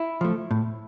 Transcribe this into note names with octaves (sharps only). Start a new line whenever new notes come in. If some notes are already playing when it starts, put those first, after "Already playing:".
Already playing: E4
F3 A3
A2